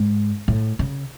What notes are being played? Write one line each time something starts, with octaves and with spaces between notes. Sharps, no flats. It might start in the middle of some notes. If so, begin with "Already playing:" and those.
Already playing: G#2
A2
C#3